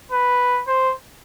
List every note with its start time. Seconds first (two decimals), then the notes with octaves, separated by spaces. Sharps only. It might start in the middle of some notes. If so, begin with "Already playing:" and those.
0.12 B4
0.68 C5